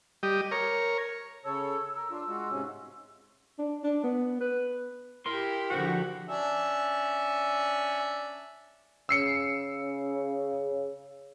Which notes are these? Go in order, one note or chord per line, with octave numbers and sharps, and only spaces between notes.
G3 G4 D#5
A#4 C#5
C#3 A4 C#5 E6
A#4
D4 F4
G#3 F4 F#4
G#2 C3 C#4
D4
D4
B3
B4
E4 G4 A#4 C6
D3 F3 F#4 C5
C#4 D4 E5
C#3 E6 C7 C#7